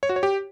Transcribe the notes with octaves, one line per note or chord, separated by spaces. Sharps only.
C#5
F#4
C#5
G4